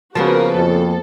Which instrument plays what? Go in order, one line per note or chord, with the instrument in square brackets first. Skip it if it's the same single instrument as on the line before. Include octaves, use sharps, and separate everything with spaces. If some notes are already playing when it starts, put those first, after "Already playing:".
[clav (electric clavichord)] C#3 A5 [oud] F3 A#3 B3 [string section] F#4 A#4 B4
[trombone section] F2 [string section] A4